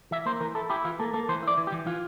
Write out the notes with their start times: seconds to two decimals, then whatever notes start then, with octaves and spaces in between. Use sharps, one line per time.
0.11 E3 E5
0.26 A#3 C5
0.40 E3 A#4
0.55 E4 A4
0.70 E4 G4
0.84 E3 F4
1.00 A#3 A4
1.14 A#3 A4
1.29 E3 C5
1.43 E4 D5
1.57 E3
1.67 G4
1.72 E3
1.86 E3 F4